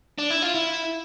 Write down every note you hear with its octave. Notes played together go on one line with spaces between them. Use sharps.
D4
E4
F4
E4